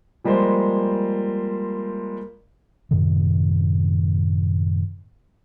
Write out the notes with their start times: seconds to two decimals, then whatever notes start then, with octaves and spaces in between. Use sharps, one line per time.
0.24 F3 G3 G#3 A#3 C5
2.91 F#2 A2 C3 D#3